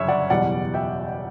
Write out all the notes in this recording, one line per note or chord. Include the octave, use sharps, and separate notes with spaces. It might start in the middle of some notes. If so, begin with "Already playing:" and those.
Already playing: G1 F#2 C#3 C#5 E5
D5 F#5
F#1 E2 B2 G3 D5 F#5
E5 G5